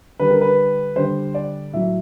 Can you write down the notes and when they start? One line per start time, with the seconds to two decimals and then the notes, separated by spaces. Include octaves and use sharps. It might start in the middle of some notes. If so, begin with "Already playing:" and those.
0.19 D3 G3 B4
0.30 A#4
0.41 B4
0.96 D3 G3 C5
1.34 D5
1.73 A2 F#3 E5